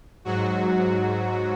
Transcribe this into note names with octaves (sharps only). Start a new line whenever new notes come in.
G#2 F#3 F#4